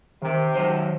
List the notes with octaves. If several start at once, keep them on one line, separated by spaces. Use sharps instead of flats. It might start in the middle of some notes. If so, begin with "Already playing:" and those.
C3 D#3 A#4
D#3 F#3 C5